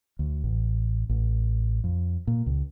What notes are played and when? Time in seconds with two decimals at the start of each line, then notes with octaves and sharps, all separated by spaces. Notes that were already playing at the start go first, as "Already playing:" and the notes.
0.19 D2
0.44 A1
1.09 A1
1.84 F2
2.27 A#2
2.46 C#2